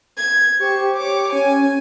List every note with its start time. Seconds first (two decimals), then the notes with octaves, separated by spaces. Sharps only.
0.16 G#6
0.60 G4 C5 C#6
0.95 C#5 D6
1.33 C#4 G#5